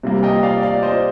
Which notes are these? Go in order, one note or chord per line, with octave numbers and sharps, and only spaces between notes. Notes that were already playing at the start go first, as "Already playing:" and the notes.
C3 G3 A#3
D#5 G5
D5 F5
D5 F5
C5 D#5